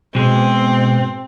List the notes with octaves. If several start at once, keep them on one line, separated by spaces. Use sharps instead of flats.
G#2 B2 G#3 C4